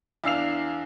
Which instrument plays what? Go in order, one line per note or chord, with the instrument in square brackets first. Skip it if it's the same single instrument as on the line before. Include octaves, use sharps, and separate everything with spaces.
[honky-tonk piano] E2 D4 F5 E6 C7 F7